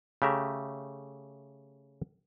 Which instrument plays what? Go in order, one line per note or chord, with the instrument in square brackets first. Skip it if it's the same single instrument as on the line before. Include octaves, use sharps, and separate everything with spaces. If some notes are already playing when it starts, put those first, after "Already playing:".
[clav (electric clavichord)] C#3 A3 G4 E5 A#5